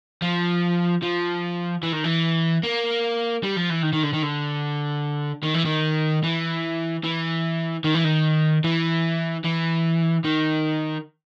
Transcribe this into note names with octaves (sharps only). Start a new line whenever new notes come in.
F3
F3
E3
D#3
E3
A#3
G3
F3
E3
D#3
D#3
D3
D#3
D3
D#3
E3
D#3
E3
E3
D#3
E3
D#3
E3
E3
D#3